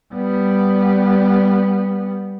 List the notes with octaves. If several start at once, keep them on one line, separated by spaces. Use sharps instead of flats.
G3 B3